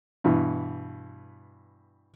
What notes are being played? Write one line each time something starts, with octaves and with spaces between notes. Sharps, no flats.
G2 B2 E3